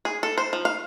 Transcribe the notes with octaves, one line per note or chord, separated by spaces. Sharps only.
G#4
A4
C5
F3
F5